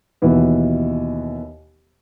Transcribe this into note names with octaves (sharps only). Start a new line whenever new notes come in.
D#2 B2 E3 B3